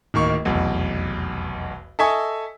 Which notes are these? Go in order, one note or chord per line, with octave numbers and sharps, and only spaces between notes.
D1 D#3 A#3 C#6
F1 B1 E2
A4 D#5 E5 G#5 C#6 D#6